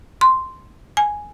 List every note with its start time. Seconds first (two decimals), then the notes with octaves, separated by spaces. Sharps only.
0.21 C6
0.97 G#5